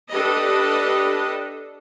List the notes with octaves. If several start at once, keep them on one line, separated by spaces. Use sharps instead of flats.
D4 G4 A4 B4 D#5